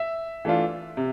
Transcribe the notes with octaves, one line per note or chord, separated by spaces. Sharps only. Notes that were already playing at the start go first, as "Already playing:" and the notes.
Already playing: E5
E3 A3 D4 F4
C3